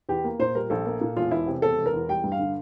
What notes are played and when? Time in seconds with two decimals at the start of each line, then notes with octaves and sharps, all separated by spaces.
0.09 E2 G4
0.24 A#3
0.39 A#2 C5
0.55 G3 A#4
0.70 A#1 A4
0.86 A#3
1.01 A#2
1.16 E1 F4
1.31 E2 E4
1.47 C3
1.62 E1 A4
1.78 E1
1.86 A#4
1.93 E2
2.09 G3 G5
2.24 G2
2.32 F5
2.39 D3